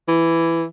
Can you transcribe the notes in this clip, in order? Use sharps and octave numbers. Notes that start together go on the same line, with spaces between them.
E3